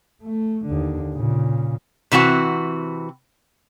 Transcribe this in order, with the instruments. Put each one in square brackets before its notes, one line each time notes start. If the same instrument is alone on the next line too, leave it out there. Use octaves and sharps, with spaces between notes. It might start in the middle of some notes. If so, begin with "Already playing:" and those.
[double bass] A3
D#2 D3
A#2 C#3
[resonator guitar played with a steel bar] C3 E3 C4 F#4